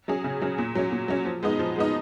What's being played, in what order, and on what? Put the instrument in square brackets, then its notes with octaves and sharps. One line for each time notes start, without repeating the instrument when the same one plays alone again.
[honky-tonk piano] F#3 C#4 G#4
C#3
F#3 C#4 G#4
A#2
F#3 C#4
A#2
F#3 C#4
F3
G#3 B3 D#4
F3
G#3 B3 D#4